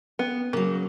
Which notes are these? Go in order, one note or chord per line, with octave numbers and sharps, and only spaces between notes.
B3
C#3 F#3 A#3